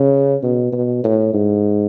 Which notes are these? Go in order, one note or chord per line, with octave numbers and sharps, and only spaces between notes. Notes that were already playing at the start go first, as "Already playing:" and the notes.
Already playing: C#3
B2
B2
A2
G#2